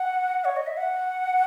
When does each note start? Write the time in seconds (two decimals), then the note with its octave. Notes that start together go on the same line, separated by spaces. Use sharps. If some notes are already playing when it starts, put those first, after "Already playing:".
Already playing: F#5
0.45 C#5
0.56 D#5
0.67 E5
0.77 F#5